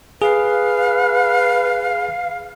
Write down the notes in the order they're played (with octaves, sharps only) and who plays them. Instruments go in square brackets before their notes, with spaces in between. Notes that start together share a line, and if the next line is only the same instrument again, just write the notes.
[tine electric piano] G#4 [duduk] B4 [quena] F5